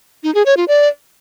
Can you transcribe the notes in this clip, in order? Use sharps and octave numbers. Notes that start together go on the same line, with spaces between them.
D#4
G#4
C#5
F4
D5